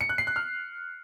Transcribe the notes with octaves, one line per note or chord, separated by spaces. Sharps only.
C#7
F#6
C7
F#6
F6